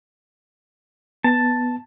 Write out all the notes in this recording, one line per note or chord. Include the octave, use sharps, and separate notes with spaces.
B3 A5